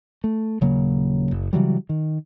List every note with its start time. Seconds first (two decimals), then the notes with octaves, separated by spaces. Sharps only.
0.24 A3
0.61 D#1 C#3 F#3 A#3
1.31 F#1
1.53 C#3 E3 F#3 G3
1.89 D#3